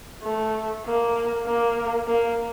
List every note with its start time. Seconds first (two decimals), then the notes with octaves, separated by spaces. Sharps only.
0.23 A3
0.85 A#3
1.46 A#3
2.08 A#3